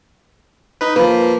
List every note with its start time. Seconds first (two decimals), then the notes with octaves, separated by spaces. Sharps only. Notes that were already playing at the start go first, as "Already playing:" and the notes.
0.81 D#4 B4
0.96 F3 A#3 B4